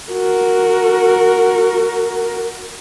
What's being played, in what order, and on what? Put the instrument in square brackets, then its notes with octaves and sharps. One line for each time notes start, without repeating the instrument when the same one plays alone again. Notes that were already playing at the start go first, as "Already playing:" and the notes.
[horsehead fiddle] F#4 A#4